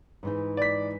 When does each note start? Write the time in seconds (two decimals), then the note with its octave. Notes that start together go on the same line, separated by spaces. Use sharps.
0.23 G#2 E3 D#4
0.57 D5 B6